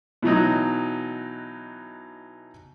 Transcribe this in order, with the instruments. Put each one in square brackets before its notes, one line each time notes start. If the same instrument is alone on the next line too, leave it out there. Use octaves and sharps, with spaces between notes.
[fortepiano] B2 E3 F#3 D#4